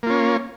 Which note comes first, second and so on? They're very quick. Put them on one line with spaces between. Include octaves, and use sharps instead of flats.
A#3 F4 C#4